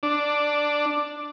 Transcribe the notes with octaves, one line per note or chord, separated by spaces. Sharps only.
D4